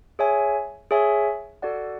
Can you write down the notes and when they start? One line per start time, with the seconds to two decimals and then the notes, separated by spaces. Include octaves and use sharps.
0.19 G#4 C#5 E5 G#5
0.91 G#4 C#5 E5 G#5
1.62 F#4 A4 D5 F#5